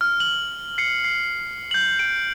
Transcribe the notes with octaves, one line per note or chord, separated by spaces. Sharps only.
F6
F#7
C7 C#7
C7
G6 F#7
D7